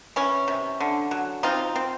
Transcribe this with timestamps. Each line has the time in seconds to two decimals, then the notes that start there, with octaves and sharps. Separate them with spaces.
0.16 E3 C#4
0.48 C3
0.80 D3
1.11 F#3
1.43 C4 D#4 F4
1.76 C4